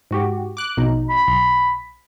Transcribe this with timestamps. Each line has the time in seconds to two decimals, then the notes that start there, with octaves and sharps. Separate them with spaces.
0.11 G#2 F#4 G4
0.57 D6 F#6
0.77 A#1 B2 D#4
1.09 B5
1.28 B1